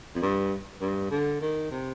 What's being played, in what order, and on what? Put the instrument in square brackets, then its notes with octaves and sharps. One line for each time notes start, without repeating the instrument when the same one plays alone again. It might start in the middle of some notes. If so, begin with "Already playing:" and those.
[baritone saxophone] F2
G2
G2
D3
D#3
C3